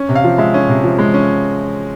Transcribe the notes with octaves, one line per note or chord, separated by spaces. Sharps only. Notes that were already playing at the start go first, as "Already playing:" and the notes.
Already playing: C#4
C3
F5
F3
G#3 E5
C#4
C3
F3
G#3
C#4